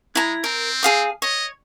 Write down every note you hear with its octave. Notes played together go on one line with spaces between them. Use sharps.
G#3 E4 A#5
C4 A#4
G#4 F5 D#6
C#5 D#5